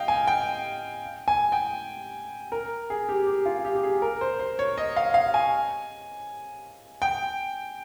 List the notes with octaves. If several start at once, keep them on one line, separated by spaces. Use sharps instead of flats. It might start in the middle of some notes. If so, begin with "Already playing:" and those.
Already playing: D#5 F5 G5
G#5
G5
G#5
G5
A#4
G#4
G4
G4
F4
G4
G4
G#4
A#4
C5
C5
C#5
D#5
F5
F5
G#5
G5